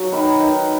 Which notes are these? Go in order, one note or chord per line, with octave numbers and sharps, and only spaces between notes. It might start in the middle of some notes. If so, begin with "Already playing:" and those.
Already playing: F#3
D#3 B4
D#3